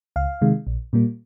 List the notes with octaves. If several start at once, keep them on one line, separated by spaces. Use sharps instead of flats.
C#2 F5
C3 D#3 G#3
A#1
A#2 G3 A#3